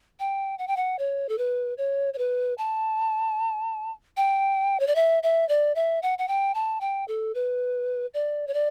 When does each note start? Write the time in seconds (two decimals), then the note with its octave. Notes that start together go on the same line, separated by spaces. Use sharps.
0.19 G5
0.59 F#5
0.67 G5
0.77 F#5
0.99 C#5
1.29 A4
1.38 B4
1.78 C#5
2.14 C#5
2.18 B4
2.58 A5
4.17 G5
4.80 C#5
4.87 D5
4.95 E5
5.23 E5
5.49 D5
5.75 E5
6.02 F#5
6.18 F#5
6.28 G5
6.55 A5
6.81 G5
7.08 A4
7.35 B4
8.14 D5
8.47 C#5
8.54 D5